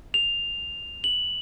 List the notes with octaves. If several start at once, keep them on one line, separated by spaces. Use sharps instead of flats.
F7
F#7